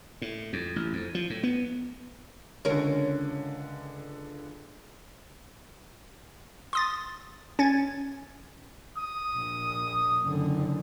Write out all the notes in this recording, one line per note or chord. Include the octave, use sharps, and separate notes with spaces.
A2
F2
A1
F2
F3
A2
B3
C#2 D3 C#4 A#4
C6 D#6 A6
C#4 G#6 A6
D#6
A#1
F#1 D3